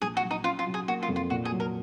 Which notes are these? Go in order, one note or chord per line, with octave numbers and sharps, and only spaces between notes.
A#1 G#4
F#4
F#3
D#4
C#4 F4
F4
F#3
G#4
A#3 F#4
F4
F2
F4
A#2 F#4
G#4
F#3
A#4